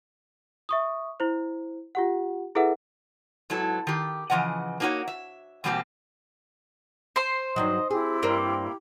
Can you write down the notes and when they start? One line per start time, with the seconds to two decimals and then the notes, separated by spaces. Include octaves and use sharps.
0.69 E5 C#6 D#6
1.20 E4 C5
1.95 F4 G4 F#5
2.55 E4 G#4 A4 B4 E5 F#5
3.50 G#2 F#3 B3 E4 A4
3.87 D#3 G4
4.30 C#3 E3 F3 D#5 F#5
4.80 A#3 C4 D#4 F4 F#4 C#5
5.08 E5
5.64 E2 B2 G3 A#3 C4 G4
7.16 C5 C6
7.56 G2 D#3 F#3 D#5
7.90 C4 E4 G4 G#4
8.23 G2 A#3 A#4 C5